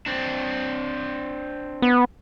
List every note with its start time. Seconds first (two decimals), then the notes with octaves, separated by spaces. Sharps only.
0.06 C4 D4
1.82 B3